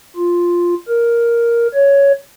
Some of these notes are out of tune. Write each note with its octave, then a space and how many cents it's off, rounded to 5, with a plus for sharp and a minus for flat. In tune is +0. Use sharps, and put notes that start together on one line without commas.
F4 +0
A#4 +5
C#5 +10